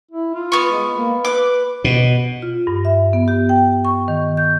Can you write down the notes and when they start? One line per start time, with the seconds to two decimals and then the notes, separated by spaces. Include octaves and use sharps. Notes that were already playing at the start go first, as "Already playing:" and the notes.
0.11 E4
0.34 F4
0.52 B3 C#6
0.71 G#3
0.95 A#3
1.25 B4 D6
1.84 B2
2.42 F4
2.67 G2
2.85 E5
3.13 B3
3.28 G4
3.49 G5
3.85 C#6
4.08 D#3
4.37 G6